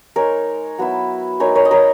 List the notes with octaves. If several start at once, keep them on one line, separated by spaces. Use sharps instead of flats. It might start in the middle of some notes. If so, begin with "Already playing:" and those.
G#3 D#4 A#4 C#5
F#3 B3 E4
G#3 D#4 A#4 C#5
A#4 C#5
D#5
A#4 C#5